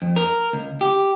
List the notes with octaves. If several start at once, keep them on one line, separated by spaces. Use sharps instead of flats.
F2
A#4
C#2
G4